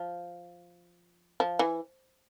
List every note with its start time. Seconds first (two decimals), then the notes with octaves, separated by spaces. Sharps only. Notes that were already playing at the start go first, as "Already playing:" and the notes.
Already playing: F3
1.40 F3
1.59 E3